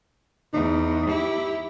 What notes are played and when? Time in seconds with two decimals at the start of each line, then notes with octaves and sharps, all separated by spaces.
0.54 E2 D#4
1.08 E4 G4